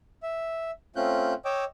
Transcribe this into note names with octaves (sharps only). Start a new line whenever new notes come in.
E5
A3 C4 C#4 F4 F#6 G6
C#5 D#5 G5 D6 E6